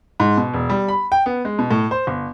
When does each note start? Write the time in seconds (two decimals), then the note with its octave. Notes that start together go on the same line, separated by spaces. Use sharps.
0.20 G#2
0.37 B2
0.54 E1
0.70 G3
0.88 B5
1.12 G5
1.26 B3
1.45 G#3
1.59 B2
1.71 A2
1.91 C5
2.07 G1